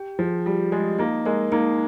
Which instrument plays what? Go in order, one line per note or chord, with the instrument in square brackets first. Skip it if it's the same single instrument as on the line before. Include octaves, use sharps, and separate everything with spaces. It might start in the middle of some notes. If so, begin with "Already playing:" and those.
Already playing: [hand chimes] G4 G5
[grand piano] F3 [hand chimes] G#4
[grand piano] G3 [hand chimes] F4
[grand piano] G#3 [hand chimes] D#5
[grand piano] A#3 [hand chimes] D#4
[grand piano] G#3 [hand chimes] A#4
[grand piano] A#3 [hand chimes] D#4